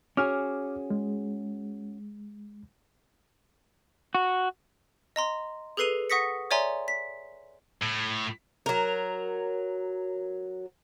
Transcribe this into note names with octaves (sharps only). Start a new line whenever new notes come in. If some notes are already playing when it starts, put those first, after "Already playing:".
C#4 F#4 G#4 D6 F6
G#3
F#4
D#5 A#5 C6
G#4 A4 B4 C7 D#7 F7
F#5 C#6 D#6 A#6 B6 C#7
C#5 D5 E5 G#5 A#5 C6
B6
A2
F#3 A#4